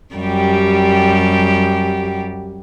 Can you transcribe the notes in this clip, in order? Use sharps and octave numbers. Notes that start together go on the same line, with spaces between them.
F#2 G3 G4